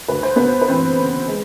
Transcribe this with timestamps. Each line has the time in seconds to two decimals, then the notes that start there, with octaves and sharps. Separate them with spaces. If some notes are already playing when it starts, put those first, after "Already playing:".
0.08 D2 B4
0.23 C5
0.36 D2 B3 B4
0.61 B4
0.68 E3 C4 C5
0.99 C#3
1.28 G#3